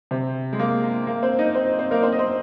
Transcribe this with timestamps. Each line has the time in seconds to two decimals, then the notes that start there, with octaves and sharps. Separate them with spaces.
0.11 C3 C4
0.53 G#3
0.59 A#3
1.07 A#3
1.23 C4 C5
1.39 D#4 D#5
1.54 C4 C5
1.79 C4 C5
1.91 A#3 A#4
2.02 C4 C5
2.12 D#5
2.19 C4 C5